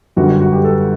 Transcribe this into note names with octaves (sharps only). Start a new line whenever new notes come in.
G1 F#2 D3 G3 F#4
F#4
F#4
G4
A4